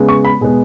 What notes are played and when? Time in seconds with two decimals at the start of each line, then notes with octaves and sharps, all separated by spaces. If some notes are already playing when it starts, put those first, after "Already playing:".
Already playing: C#3 G#3 B3
0.09 C#6
0.25 B5
0.41 B2 G#3 B3